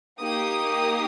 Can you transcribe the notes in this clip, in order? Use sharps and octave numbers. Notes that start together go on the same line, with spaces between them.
A#3 D#4 G4 D#6